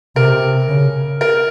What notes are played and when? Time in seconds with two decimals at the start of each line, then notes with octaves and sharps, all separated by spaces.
0.16 C3 A#4
0.68 C#3
1.21 A#4